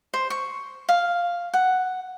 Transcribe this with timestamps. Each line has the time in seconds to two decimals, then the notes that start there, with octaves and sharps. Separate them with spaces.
0.14 C5
0.30 C#6
0.89 F5
1.54 F#5